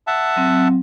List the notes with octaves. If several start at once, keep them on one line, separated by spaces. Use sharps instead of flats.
E5 F#5 A5
F#3 C4